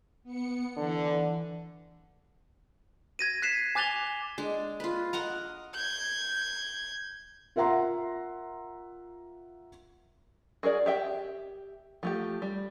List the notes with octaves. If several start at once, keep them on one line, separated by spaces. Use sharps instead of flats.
B3 C#7
D3 E3
G#6 A#6 D#7
F#6 B6 C7 E7
G#5 D6 F#6 A6 F7 G7
G#3 D4
F4 B4
A#4 D#5 F#5 A#5
G6 G#6
F4 A#4 E5 F#5 A#5 C6
F#4 G#4 A#4 D5
G4 E5 G5
F3 A3 G4
G3